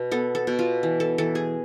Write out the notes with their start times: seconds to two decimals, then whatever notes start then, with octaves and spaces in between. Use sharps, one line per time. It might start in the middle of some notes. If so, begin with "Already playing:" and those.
Already playing: B2
0.11 B3 A4
0.35 A4
0.47 B2
0.59 F4
0.83 E3
1.00 A4
1.18 E3 A4
1.35 G#4